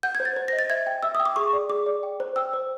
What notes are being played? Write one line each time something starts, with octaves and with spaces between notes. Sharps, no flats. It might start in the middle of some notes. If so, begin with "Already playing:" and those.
F#5 G6
G#6
C5
A6
C5
D#5 A#6
A6
E5 G#6
G5
E5 E6
D#6
G5
D6
G#4 C#6
D5
G#4 D6
D5
G5
C5
G5 E6
C5